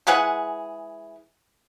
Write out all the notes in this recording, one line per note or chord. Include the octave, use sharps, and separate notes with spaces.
E3 G#3 G#4 F#5